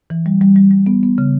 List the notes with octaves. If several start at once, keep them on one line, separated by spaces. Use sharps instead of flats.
E3
G3
G3
G3
G3
B3
B3
C#3